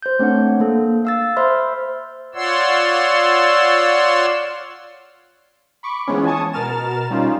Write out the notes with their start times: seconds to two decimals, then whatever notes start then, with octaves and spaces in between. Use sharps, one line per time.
0.03 C5 G6
0.19 A3 C4 D4 C#5 F#5
0.60 A#3 A4
1.05 F5 E6 A6
1.37 C5 E5 B5 C6 E6 F6
2.35 F4 C#5 D5 F#5 C6 E6
5.83 B5 C#6 D6
6.07 E3 F3 G#3 B3 C#4
6.25 G#5 A5 C#6 D#6
6.53 B2 A#4 F6 A6 E7
7.10 G3 C#4 D#4 F4